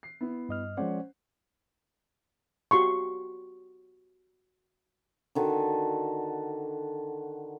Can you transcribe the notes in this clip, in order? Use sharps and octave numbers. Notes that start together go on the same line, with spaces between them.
C7
B3 E4
G2 D#5 F6
F3 G#3 C#4 C5 D5 F#5
F#4 G4 C6 C#6
D3 D#3 F#4 A4